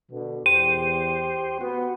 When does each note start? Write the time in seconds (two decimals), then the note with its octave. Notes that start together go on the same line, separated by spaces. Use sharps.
0.11 B2 D3
0.46 E2 G4 C5 D#7
1.61 B3 F#4